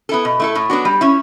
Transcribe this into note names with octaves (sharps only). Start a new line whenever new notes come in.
B3 E4 A4
B2
A3 E4 A4
A2
F#3 B3 D4 F#4
G3
C#4 E4